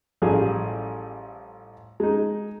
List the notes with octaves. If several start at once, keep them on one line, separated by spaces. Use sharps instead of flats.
A1 F3 G3 G#4
G#3 D#4